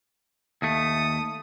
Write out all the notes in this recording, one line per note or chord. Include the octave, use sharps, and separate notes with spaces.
D#2 A3 D#6